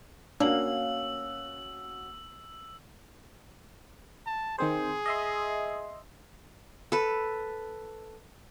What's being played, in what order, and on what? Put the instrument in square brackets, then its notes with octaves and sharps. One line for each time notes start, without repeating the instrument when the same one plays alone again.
[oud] A#3 [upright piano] C#4 F#4 [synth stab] D4 [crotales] E6 F#7
[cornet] A5
[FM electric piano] D#3 C4 C5 [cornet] G#4
[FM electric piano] D#5 E5 C6
[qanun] A4 B4